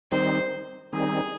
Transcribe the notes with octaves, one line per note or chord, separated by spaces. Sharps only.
D#3 G3 C4 D#4 C5
D#3 G3 C4 D#4 G#4